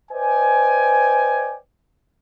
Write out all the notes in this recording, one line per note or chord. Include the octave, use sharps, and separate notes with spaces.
B4 C5 D5 D#5 G5 G#5